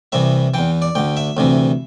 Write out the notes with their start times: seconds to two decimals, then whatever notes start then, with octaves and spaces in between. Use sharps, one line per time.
0.12 C2 C3 E3 E5
0.54 E2 E3 G5
0.82 D5
0.95 D2 D3 G5
1.17 E5
1.37 D2 C3 E3